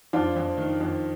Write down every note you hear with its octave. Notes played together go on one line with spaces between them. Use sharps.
F2 D4 F4
F2
D#3
F2